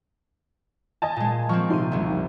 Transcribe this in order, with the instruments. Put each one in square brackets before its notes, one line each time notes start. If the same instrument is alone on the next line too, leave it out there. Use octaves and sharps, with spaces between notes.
[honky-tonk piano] D#5 G#5 A5
[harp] A#2 G#3
[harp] F3 A#3 C4 [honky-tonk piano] C#6
[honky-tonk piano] C3 D#3 [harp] C6 D#7
[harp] F#1 C2